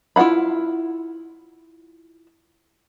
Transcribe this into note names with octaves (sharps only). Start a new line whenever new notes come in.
E4 F4 C5 F#5 B5